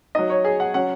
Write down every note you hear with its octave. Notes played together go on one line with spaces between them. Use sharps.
F#3 D#4 D#5
C#5
G#4
F#5
F#3 C#4 F#5